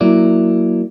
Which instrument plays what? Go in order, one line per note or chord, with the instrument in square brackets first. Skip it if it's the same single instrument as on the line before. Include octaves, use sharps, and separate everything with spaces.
[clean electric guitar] F#3 A#3 E4 D5